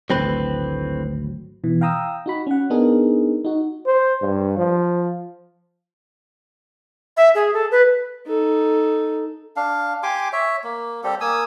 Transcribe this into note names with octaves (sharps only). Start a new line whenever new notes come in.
G#1 D2 A2 F#3 C4 B4
B2 E3
F5 G5 A#5 D#6 E6
D#4 F#4 B5
C#4 F#5
B3 D4 D#4 G#4 A#4
D#4 F#4
C5
G2
F3
E5
G#4
A4
B4
D#4 A4
D4 F5
G4 G#5 C6 D6
C#5 E5
A#3
G3 C4 G4 A4
A#3 G#5 D#6 E6